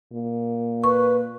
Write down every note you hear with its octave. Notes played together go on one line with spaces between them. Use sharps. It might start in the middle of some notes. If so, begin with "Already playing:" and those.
A#2
B4 C#6